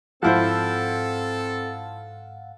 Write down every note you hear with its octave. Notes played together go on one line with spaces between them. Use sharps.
G#2 F3 C4 E4 A4 C5 F5 F#5